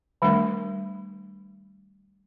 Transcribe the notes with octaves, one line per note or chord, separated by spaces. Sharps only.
D#3 G3 A3 D4 A#4